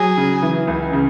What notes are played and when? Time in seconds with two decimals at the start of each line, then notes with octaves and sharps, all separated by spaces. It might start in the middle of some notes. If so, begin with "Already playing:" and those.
Already playing: F#3 G#4
0.17 C#3
0.42 E3
0.67 C#2
0.93 C#3